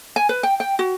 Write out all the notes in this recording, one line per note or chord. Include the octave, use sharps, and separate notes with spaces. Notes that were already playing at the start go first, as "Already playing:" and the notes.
G#5
B4
G5
G5
F#4